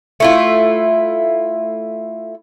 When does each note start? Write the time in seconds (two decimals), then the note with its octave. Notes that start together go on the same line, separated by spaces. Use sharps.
0.20 A3 E4 F4